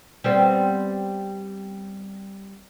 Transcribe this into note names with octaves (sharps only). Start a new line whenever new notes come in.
G3 B3 C4